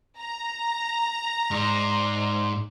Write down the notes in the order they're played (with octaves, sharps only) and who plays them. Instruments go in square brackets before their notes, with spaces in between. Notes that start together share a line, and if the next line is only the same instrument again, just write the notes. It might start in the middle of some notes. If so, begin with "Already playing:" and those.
[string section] A#5
[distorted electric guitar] G#2 [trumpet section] D5 C6